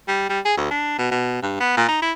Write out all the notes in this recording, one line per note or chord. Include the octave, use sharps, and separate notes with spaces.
G3
G3
G#4
D2
D4
B2
B2
G2
B3
A#2
D#4
E4